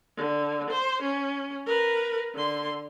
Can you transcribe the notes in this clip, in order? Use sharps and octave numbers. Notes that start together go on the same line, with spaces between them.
D3
C5
C#4
A#4 B4
D3 C6